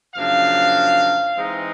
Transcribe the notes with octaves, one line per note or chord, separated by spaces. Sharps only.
F#2 C#3 F3 A#3 D4 F5
E3 G#3 C4 D#4